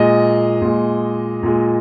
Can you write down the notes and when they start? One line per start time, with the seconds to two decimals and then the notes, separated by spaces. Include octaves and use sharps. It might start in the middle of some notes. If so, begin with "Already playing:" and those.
Already playing: A#2 G#3 D#5
0.62 A#2 G#3
1.43 A#2 G#3